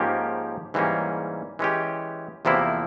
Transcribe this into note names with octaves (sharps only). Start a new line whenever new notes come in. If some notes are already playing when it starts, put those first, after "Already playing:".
Already playing: G#2 F3 A#3 C#4 G4
G#2 E3 G3 A#3 C#4
E3 G#3 C#4 G4
E2 C3 F3 A#3 E4